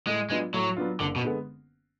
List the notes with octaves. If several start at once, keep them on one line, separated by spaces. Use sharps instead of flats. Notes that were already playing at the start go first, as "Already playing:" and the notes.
A2 G#3
F#3 G#3 B3 D4 F4
A2 F#3
F#3 B3 D4 F4
F#1 D3
B2
D3 G#3 B3